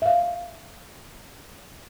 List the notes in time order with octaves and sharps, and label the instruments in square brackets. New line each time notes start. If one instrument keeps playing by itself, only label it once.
[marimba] E5 F5